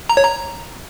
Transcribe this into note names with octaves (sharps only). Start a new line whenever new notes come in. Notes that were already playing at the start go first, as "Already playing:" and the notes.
A#5
C#5
A#5